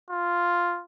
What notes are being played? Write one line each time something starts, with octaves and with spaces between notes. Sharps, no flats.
F4